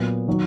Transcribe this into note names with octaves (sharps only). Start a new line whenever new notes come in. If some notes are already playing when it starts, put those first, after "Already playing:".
Already playing: A#2 F#3 B3
D#3 F#3